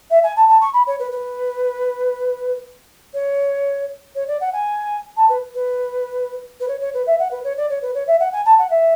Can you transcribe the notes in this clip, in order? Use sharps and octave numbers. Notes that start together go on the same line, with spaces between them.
E5
G#5
A5
A5
C#6
B5
C#5
B4
B4
C#5
C#5
D5
F#5
G#5
A5
B4
B4
B4
C#5
C#5
B4
E5
F#5
B4
C#5
D5
C#5
B4
C#5
E5
F#5
G#5
A5
F#5
E5